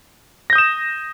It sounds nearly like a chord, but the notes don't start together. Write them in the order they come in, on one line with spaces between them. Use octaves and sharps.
A#6 G6 D#6 E7